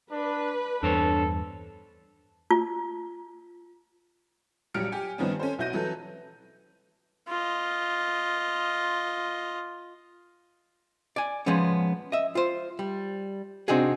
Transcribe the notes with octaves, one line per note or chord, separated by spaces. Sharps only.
D4 B4
E2 G2 D4 A4 C5 C#5
F4
A#1 F#3 G3 F6 C#7 D7
G4 G#5
G2 D#3 F3 B3 C#4
C#4 A4 C5
B1 E4 F#4 G6 A#6 D#7
E3 F#3 A4
F4 D#5
D5 G#5
F3 G#3 B3 C#4
D#5 E5
F4 C5
G3
C3 C4 D4 D#4 F#4 G#4